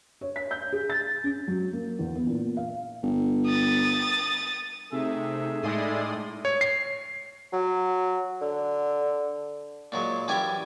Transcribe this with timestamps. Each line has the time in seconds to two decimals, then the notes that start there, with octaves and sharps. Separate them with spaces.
0.21 C#5
0.36 B6
0.51 G6
0.72 G#4
0.90 A6
1.24 C#4
1.48 F#3
1.73 A#3
1.99 E2
2.15 B3
2.27 A#2
2.57 F5
3.03 G1
3.47 D#6 A6
4.92 C3 A3 D#4 G#4 E5
5.63 A2 G#3 D5 C6 D#6
6.45 C#5
6.61 C7
7.53 F#3
8.41 D3
9.92 A#2 F#3 G#3
10.28 F#2 E3 G3 G4 E5 G#5